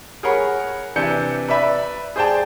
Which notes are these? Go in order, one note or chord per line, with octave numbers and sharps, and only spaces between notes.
G#4 A#4 C#5 F#5 B5
C3 E3 D4 G#5 G6 C#7
B4 D5 E5 B5
G#4 C5 D5 G5 A5